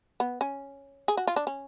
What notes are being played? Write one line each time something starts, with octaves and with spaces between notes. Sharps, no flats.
B3
C#4
G#4
F#4
F4
D4
C#4